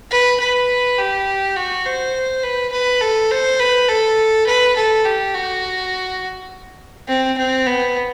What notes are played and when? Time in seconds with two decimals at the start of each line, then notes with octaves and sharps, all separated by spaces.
0.10 B4
0.40 B4
0.98 G4
1.56 F#4
1.85 C5
2.43 B4
2.72 B4
3.01 A4
3.30 C5
3.59 B4
3.89 A4
4.47 B4
4.76 A4
5.05 G4
5.34 F#4
7.08 C4
7.37 C4
7.66 B3